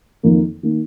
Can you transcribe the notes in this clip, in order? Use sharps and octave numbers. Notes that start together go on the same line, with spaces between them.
F2 D#3 A#3
D#3 A#3